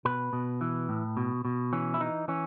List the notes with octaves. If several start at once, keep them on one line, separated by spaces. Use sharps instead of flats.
B2 B4
B2
E3
A2
B2
B2
E3 C#4
E4
E3 D#4
E3 C#4